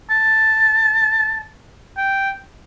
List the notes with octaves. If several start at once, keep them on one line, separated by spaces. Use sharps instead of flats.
A5
G5